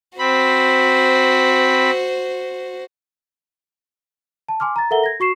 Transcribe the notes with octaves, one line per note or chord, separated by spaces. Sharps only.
C4 F#4 C5 B5
A5
G#5 C6 D6 F6
A#5 A6
A4 A#4 E5 F#5 A#5 G7
G#6 A#6
F#4 C#6 C7 E7